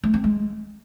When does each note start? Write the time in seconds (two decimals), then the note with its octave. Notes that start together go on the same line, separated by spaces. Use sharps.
0.04 A3
0.14 C4
0.24 G#3